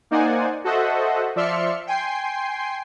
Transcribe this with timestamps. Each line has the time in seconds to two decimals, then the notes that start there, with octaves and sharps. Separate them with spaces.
0.11 A#3 D#4 C5 D5 F#5 G#5
0.64 F#4 A4 C5 D#5 E5 F#5
1.36 F3 D5 E5 C6 F6 C#7
1.87 G5 G#5 C6 C7